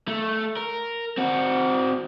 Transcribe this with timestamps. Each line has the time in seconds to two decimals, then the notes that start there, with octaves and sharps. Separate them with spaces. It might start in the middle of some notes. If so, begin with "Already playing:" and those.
0.08 A3
0.57 A#4
1.18 C4 F#4